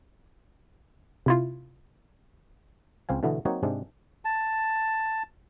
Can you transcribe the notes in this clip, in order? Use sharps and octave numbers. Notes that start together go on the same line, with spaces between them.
C3 E4 F4
C#2 C4 F5 G#5
B2 D3 E3 A3 B3
F#3 A#3 C4 D#4 F#4 C#5
G#2 C3 G#3 D4
A5